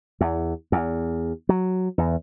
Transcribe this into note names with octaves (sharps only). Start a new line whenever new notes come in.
E2
E2
F#3
E2